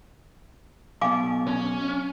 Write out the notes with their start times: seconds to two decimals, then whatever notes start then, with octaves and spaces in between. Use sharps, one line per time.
1.01 B1 B2 F5 G#5 D6
1.47 C#4